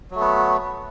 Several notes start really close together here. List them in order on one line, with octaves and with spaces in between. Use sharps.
F#3 A3 B3